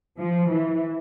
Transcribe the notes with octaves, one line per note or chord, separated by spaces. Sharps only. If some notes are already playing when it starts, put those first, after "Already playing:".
F3
E3